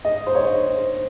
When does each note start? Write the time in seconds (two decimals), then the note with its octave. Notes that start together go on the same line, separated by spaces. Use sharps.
0.05 D#5
0.26 C5
0.35 C#5